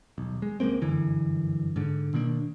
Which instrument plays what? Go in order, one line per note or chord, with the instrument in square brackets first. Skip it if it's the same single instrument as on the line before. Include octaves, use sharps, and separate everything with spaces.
[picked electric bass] D#1 B1
G#3
C#2 G#3 A#3 C4
G1 F#2 D3 E3
G#2 D3
B2 D#3 A#3 D4